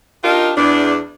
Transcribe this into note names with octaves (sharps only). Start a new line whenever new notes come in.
D4 D#4 F4 G4 A#4
E2 D4